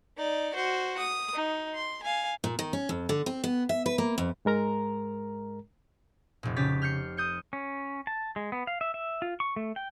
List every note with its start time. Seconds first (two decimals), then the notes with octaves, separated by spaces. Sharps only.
0.17 D#4 D5
0.54 F#4 C5
0.98 D#6
1.33 D#4
1.75 C6
2.03 F5 G#5
2.44 A#2
2.59 D#3
2.73 C#4
2.89 F2
3.09 D3
3.26 C4
3.44 B3
3.69 E5
3.86 B4
3.98 A#3
4.18 F2
4.45 G#2 G#3 A#4 A#5
6.43 F1 A#2
6.56 C#3 C#4 G4 A6 B6
6.82 F6 G6 C7 C#7
7.17 D#6 G6 C#7
7.53 C#4
8.07 A5
8.36 G#3
8.52 B3
8.67 F5
8.81 E5
8.94 E5
9.22 F4
9.40 C#6
9.56 A3
9.76 G5